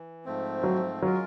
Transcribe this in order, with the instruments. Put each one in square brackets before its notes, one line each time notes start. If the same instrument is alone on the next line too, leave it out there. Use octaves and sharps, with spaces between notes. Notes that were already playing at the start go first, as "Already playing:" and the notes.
Already playing: [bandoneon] E3
G#2 F3 A3 C4
[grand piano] F#3
[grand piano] F#3 [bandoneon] G#3 C#4 F4 A#4